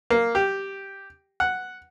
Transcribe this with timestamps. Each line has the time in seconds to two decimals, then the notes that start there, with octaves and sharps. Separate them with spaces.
0.10 A#3
0.35 G4
1.40 F#5